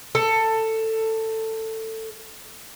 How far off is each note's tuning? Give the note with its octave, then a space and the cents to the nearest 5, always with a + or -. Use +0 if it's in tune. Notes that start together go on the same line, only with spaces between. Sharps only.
A4 +15